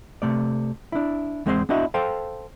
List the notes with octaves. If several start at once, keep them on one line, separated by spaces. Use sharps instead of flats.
C3 A3 D5
D4 E4
E2 G#3 C4 C5 F5 C6
B3 D4 E4 F#4 D#5 E5
A4 C5 F5 G5